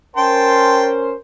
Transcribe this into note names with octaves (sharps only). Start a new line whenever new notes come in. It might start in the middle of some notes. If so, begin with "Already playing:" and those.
C#4 A#4 C5 G5 A5 C6